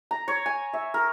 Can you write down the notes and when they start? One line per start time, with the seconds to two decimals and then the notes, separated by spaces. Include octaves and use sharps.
0.11 A#5
0.28 C#5
0.46 G#5
0.73 E5
0.94 A#4